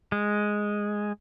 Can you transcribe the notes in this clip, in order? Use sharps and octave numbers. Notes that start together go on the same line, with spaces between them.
G#3